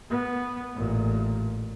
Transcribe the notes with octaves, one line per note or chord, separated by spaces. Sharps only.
B3
A1 A#2